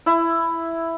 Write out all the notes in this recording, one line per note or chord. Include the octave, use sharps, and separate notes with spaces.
E4